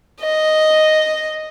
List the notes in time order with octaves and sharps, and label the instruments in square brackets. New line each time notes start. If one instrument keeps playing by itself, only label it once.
[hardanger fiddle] D#5